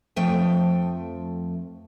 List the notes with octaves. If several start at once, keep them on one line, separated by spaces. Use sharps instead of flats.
F2 F3 A3 G5